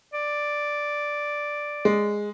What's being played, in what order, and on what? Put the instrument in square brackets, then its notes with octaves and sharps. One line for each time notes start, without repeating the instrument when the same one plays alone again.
[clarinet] D5
[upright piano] G#3